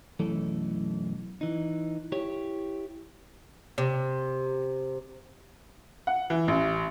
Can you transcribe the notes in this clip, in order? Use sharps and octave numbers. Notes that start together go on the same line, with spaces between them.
B1 F#2 E3 A3 A4
E3 D#4
E4 G4 C#5
C3
F#5
E3
A1